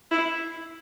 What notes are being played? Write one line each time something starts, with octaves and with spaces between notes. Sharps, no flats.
E4